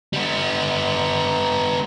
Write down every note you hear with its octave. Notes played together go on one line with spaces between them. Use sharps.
G3 B3